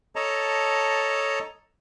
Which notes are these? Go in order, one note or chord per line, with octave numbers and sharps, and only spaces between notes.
A4 C#5 D#5 A5 A#5